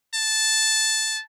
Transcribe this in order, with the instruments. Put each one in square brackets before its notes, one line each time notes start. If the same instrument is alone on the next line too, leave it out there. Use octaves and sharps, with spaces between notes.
[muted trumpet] A5